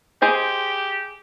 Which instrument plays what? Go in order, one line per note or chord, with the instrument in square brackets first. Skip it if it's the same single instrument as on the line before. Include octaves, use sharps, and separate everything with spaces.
[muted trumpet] G4 [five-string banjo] G#4 C5 D#5